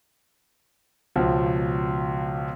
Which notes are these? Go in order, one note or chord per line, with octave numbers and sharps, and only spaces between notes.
C#2 B2 F3